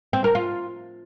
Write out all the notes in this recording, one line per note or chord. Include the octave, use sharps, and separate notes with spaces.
C4
A#4
F4